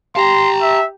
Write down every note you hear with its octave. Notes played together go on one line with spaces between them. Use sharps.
G4 A5 A#5 C6
E5